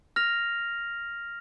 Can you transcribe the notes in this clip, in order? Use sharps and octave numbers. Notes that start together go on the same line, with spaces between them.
F6 A#6 F7